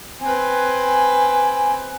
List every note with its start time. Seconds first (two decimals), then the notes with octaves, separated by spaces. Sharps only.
0.22 C4 B4 G#5